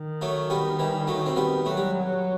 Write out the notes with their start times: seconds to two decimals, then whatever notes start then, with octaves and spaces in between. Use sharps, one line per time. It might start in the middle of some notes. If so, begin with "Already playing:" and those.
Already playing: D#3
0.21 F#3 A3
0.50 G3 B3
0.79 E3 G3
1.07 F#3 A3
1.26 C4
1.36 G3 B3
1.65 F#3 A3
1.77 G3